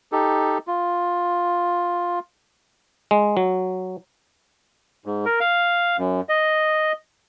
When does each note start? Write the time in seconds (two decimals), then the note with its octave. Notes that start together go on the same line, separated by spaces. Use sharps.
0.12 D#4 G4 A4
0.67 F4
3.11 G#3
3.37 F#3
5.06 G#2
5.25 A#4
5.40 F5
5.98 F#2
6.29 D#5